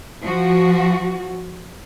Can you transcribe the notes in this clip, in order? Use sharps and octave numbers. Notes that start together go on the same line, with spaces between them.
F3 F#4